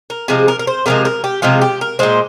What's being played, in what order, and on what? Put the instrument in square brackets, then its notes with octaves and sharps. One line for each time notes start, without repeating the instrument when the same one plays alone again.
[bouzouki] A#4
C3 F3 G#3 G#4
A#4
A#4
C5
C3 F3 G#3 A#4
A#4
G4
C3 F3 G#3 F4
G4
A#4
A#2 G#3 C5